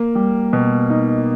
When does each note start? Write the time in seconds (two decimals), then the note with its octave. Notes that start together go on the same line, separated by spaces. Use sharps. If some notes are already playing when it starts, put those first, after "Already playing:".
Already playing: A#3
0.15 G3
0.53 B2
0.90 D#4